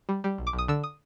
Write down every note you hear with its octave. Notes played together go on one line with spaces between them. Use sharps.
G3
G3
B1
D6
B1
D#6
D3 E6
D#6